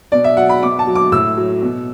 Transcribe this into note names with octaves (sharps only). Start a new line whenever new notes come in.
B2 D5
E5
F#3 F#5
B5
B2 D6
A5
F#3
D6
A2 E6
F#3
B2